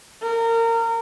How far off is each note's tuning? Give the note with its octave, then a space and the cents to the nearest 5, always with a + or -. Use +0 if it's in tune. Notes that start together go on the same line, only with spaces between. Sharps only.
A#4 -25